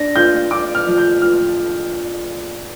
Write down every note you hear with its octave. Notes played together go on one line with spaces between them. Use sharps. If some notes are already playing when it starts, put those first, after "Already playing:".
Already playing: D4 A#6
F4 G6
F4 D6
F6
F3
G6
F4 F6